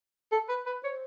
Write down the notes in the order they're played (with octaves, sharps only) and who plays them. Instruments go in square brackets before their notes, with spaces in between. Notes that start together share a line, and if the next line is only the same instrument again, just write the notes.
[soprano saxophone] A4
B4
B4
[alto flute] C5 [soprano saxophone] C#5